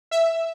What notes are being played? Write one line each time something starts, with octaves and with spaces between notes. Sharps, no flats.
E5